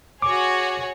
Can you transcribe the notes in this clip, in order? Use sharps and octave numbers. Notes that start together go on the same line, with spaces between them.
F#4 G#4 C#5 D6